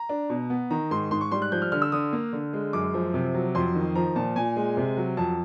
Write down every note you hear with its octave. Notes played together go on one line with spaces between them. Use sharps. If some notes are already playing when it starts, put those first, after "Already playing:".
Already playing: A#5
D4
B2
B3
D#3 A#5
G#2 C6
G#2 C6
C#6
G3 C6
F#6
F3 G6
F6
D3 F6
E6
D3 D#6
A#3
D3
G#3
F#2 D6
F3
C3
F#3
F2 C6
D#3
F3 A#5
A#2 A5
A#2 G#5
G#3
C3
F#3
F2 A5